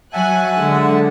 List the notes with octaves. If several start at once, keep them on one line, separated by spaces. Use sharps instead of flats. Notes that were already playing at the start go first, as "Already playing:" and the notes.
F#3 E5 F#5 G#5 A5 F#6
D3 G#3